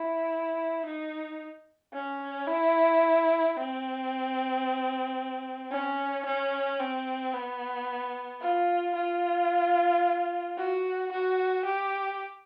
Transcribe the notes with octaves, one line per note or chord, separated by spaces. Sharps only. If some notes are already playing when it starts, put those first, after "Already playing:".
Already playing: E4
D#4
C#4
E4
C4
C#4
C#4
C4
B3
F4
F4
F#4
F#4
G4